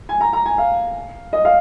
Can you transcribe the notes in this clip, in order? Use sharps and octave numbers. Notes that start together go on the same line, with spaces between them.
G#5
A#5
A#5
G#5
F5
D#5
F5